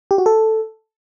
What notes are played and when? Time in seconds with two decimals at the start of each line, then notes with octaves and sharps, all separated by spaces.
0.11 G4
0.18 F#4
0.26 A4